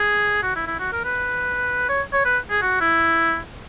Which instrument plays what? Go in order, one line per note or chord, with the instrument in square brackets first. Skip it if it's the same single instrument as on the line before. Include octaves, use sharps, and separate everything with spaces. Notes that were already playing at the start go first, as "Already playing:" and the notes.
Already playing: [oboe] G#4
F#4
E4
E4
F#4
A#4
B4
C#5
C#5
B4
G#4
F#4
E4